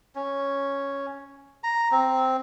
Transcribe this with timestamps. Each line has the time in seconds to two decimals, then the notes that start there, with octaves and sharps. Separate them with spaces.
0.15 C#4
1.64 A#5
1.92 C4